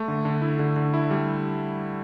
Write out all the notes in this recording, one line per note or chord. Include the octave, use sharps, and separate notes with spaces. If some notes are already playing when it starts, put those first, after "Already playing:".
Already playing: A3
D3
D3
E4
D3
D3
E4
G3